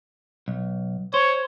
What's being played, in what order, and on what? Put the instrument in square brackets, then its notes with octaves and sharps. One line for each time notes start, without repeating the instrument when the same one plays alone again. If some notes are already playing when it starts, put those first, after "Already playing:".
[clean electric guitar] B1
[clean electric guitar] C5 [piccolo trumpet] C#5